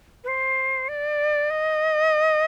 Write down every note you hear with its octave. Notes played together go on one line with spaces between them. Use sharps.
B4
C5
D5
D#5